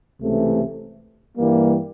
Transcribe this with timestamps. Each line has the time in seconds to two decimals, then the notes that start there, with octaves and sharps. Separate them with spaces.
0.21 C#2 C3 E3 A3
1.37 G2 E3 G3 A#3